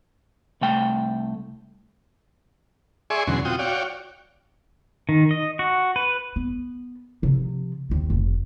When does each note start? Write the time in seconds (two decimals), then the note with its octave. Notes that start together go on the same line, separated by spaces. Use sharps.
0.61 C2 A3 G5
3.10 G#4 D5 E5 G#5 C6 C#6
3.27 E2 B2 D3 F#3 C#4 C6
3.45 C4 F4 F#4 G5 D#6
3.59 F#4 C#5 D5 F5 G5
5.09 D#3
5.31 D#5
5.59 F#4
5.96 B4
6.36 B3
7.22 C3 F3
7.89 D#2 D3
8.10 F1